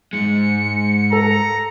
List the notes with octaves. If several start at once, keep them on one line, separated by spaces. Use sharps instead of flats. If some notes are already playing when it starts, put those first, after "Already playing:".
G#2 G#3 C#7
A4 A#5